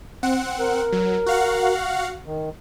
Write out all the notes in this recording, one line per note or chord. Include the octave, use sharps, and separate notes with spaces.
C4 F#5
A#4
F#3
F#4 F5 F#5
D#3